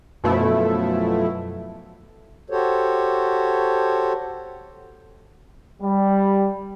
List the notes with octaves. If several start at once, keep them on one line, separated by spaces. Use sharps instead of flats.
F#2 B2 F3 A3 E4
F#4 G4 A4 C5 C#5
G3